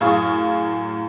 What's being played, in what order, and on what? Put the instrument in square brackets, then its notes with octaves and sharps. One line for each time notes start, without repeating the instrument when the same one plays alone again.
[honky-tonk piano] F#2 A2 G#4 F5 C#6 D#6